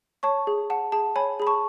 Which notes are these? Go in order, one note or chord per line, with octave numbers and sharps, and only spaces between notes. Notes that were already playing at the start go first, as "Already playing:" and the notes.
C#5 A5 C#6
G#4
F#5 A5
G#4 A5
C#5 G#5 B5
G#4 B5
A5 C#6